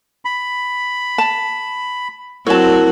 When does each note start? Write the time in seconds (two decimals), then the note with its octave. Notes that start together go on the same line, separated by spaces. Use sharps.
0.25 B5
1.18 A5
2.47 F#3 C4 E4 F#4 A#4 C#5 A5